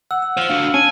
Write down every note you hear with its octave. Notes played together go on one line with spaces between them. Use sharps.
F#5 E6
E6
C5 F5 F6 G7
D4 F#4 F5
C#4 G#5 A5